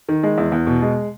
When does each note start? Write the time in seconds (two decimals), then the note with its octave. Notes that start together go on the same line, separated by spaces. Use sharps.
0.09 D#3
0.23 G#3
0.38 E2
0.52 E2
0.67 B2
0.82 G#3